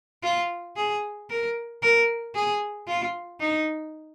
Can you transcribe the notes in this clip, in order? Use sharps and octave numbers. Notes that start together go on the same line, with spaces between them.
F4
G#4
A#4
A#4
G#4
F4
D#4